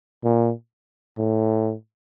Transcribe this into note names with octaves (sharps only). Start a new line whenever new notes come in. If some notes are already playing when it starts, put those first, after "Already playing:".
A#2
A2